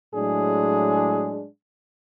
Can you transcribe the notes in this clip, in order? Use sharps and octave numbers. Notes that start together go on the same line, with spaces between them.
A2 F#3 G#3 D4 G#4